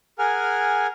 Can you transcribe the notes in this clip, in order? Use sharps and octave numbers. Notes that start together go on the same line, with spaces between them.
G#4 A#4 F#5 G#5 F6